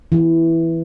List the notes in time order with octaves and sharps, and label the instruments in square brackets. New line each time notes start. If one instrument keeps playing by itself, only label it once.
[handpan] E3